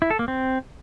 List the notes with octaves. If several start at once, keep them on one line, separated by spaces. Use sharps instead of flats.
E4
A4
A#3
C4